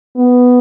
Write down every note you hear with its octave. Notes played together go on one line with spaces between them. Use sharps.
B3